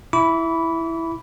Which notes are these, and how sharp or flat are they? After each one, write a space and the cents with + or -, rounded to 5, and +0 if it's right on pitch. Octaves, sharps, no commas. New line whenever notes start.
E4 +0 B5 +0 D6 -40